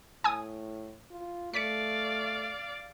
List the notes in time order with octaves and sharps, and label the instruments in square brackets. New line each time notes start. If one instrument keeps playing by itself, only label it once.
[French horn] A2 [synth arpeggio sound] G#5 D#6
[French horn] F4
[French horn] A3 [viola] D5 F5 [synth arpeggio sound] B6 C#7